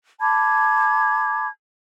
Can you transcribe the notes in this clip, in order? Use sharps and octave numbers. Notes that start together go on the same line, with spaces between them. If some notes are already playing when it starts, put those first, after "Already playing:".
A5 B5 D6 G#6